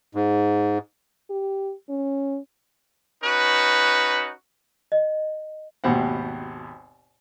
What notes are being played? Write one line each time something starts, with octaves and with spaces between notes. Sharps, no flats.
G#2
G4
C#4
C#4 D#4 F#4 B4
D#5
G#1 D#2 B2 G4 C5 F#5